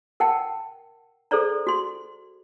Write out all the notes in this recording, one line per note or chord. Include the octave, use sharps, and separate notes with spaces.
A#4 F#5 G5 A5
G#4 A4 C5 D5 A#5
F#4 C6